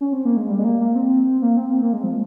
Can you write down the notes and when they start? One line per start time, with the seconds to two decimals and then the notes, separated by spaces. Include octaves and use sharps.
0.01 C#4
0.13 C4
0.25 A#3
0.37 G#3
0.49 G3
0.59 G#3
0.64 A#3
0.80 A#3
0.95 C4
1.42 A#3
1.57 C4
1.72 C4
1.82 A#3
1.93 G#3
2.03 F3